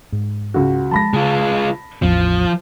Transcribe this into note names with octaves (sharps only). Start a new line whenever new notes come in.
G#2
C#2 F#4
F3 G#3 A5 B5 A#6
C#3 G#3 F4
A1 E2 F3 B3